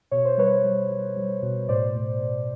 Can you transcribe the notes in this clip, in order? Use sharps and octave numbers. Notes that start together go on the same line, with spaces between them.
B2 C#5
C5
G3 B4 C#5
G3
G3
G3
B2
A2 C5 D5
A2
A2